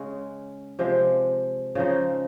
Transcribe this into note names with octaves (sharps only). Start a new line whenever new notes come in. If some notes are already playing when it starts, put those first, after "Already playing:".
Already playing: C#3 G#3 C#4
C3 F3 G#3
C#3 F3 G#3 D#4